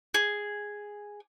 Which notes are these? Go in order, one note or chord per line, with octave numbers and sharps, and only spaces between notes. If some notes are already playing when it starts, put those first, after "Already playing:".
G#4